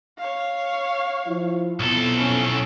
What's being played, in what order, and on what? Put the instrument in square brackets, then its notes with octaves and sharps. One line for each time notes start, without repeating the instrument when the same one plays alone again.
[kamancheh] C#5 F5
[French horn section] F3 E4
[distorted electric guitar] B1 A4 [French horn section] F2 B3 E4
[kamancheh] C#4